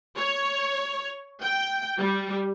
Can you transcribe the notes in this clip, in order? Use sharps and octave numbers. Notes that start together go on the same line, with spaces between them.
C#5
G5
G3